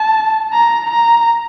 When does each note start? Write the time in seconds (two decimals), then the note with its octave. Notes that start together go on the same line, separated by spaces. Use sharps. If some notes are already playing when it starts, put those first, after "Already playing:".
Already playing: A5
0.53 A#5
0.91 A#5